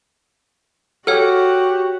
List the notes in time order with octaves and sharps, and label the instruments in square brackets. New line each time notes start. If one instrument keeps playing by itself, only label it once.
[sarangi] F#4 [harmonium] G4 [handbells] A4 [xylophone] C#5 F#5 F6